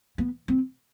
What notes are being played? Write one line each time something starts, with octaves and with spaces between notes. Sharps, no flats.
B3
C4